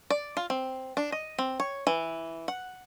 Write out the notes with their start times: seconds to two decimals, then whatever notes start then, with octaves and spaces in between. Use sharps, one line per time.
0.10 D5
0.37 F4
0.50 C4
0.97 D4
1.12 D#5
1.38 C4
1.60 C#5
1.87 E3
2.48 F#5